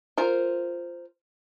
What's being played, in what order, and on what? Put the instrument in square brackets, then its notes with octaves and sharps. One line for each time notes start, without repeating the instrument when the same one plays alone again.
[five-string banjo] F4 A#4 C5